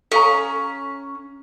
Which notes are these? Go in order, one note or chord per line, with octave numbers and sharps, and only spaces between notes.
C#4 A4 F5 A#5